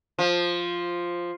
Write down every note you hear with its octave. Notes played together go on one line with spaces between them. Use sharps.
F3